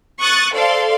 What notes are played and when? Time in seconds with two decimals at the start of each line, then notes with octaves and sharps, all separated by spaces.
0.19 C#6 D#6 F#6 A6
0.53 A4 C5 D5 F5 C6